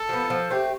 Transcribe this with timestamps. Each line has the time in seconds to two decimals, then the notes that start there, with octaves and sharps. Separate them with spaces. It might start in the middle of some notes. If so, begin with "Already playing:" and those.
Already playing: A4
0.09 F3 B3
0.30 F3
0.50 A3 C4 G4